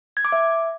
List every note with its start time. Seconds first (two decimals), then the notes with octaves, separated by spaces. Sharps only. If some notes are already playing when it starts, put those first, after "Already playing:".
0.17 G#6
0.25 D6
0.32 E5